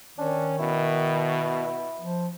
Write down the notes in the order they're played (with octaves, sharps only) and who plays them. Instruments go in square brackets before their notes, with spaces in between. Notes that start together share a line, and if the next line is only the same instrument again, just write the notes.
[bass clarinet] D#3 [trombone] C#4 [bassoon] D4
[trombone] B2 [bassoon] E4
[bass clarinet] F3